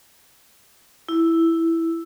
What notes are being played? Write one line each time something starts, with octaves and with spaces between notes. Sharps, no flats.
E4